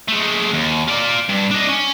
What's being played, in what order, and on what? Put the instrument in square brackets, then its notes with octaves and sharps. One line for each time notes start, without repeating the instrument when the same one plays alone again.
[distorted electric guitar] G#3 A3
D#2
F4 D5
G2
D4 D#5
C#4